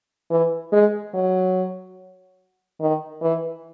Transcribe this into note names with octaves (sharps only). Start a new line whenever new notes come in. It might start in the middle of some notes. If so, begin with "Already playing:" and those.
E3
G#3
F#3
D#3
E3